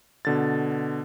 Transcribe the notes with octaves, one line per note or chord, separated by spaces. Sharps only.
B2 D3 A6